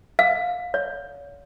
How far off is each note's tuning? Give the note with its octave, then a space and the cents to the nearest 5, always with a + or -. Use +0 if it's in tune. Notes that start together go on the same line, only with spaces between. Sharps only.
F5 +30
C#5 +40